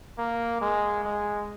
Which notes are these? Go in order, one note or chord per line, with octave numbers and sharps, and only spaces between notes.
A#3
G#3
G#3